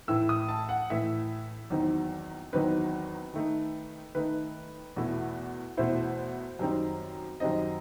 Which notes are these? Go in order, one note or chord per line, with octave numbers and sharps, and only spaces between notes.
A2 E3 A3 E4 E6
D#6
A5
F#5
A2 E3 A3 E4 E5
E2 D#3 F#3 C4 D#4
E2 D#3 F#3 C4 D#4 B4
D#3 A3 D#4
D#3 A3 D#4 B4
E2 B2 A3 E4
E2 B2 A3 E4 C5
F#2 D#3 G3 C4 D#4
F#2 D#3 G3 C4 D#4 D#5